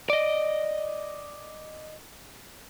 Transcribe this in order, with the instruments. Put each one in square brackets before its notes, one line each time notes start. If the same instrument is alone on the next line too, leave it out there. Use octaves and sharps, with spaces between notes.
[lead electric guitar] D5 D#5